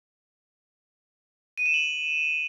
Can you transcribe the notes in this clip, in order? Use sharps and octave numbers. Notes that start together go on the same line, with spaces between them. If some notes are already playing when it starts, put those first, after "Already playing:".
D#7
E7
F#7